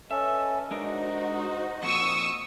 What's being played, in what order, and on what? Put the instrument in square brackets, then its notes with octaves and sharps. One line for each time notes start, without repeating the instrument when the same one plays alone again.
[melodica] C#4 A4 [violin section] B4 D#5 [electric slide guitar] E5
[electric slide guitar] G#3 D4 A#4 [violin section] D#4 F#4 C5 [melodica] D#5
[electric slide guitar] F2 A#2 [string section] C#6 D#6 E6